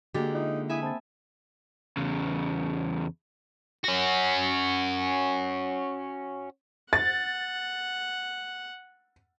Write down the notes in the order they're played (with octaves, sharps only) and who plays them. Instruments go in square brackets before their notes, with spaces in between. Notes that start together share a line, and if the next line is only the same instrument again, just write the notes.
[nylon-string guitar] D3 G#3 [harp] A#3 G4 [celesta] F#4 D6 A6
[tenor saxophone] D#4 [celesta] F4 E5
[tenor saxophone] E4 [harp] E5 G#5 D#6
[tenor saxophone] C4 [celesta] A5 B5 A6
[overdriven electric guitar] E2 C#3
C#4 F#4
[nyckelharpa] F#5 [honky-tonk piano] A6